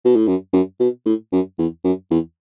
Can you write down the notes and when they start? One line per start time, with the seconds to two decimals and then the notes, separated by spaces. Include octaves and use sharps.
0.05 B2
0.16 A2
0.27 F#2
0.53 F#2
0.80 B2
1.06 A2
1.32 F#2
1.58 E2
1.84 F#2
2.11 E2